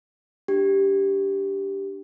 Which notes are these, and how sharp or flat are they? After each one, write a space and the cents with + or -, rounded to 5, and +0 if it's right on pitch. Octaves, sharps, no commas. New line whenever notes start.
D4 -10 G4 +0